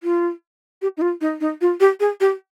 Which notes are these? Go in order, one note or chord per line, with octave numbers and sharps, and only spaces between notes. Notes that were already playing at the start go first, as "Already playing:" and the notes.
F4
G4
D#4
F4
D#4
D#4
F4
G4
G#4
G4